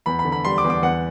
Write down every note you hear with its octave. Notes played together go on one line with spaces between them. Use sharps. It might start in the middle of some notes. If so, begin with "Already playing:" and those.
E2 B5
B5
D3
B5
G3 C6
D6
E2
D6
E2 F#5